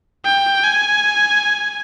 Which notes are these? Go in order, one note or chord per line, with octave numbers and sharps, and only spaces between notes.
G5
G#5